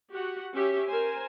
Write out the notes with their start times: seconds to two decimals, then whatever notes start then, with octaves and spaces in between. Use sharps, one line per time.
0.12 F#4 G4 F#5
0.54 C#4 G4 E5
0.88 A#4 C5 G#5